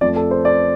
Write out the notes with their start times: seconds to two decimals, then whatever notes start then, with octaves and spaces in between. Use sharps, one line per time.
0.01 F2 F3 A3 D5
0.16 A4
0.31 C5
0.45 D5